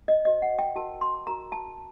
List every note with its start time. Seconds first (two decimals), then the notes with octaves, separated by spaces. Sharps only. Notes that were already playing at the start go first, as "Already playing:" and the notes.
0.08 D#5
0.25 F#4 C5 D#5
0.42 F#5
0.59 G5
0.75 F#4 A#4 A5
1.01 C6
1.27 F#4 A#4 A#5
1.52 A5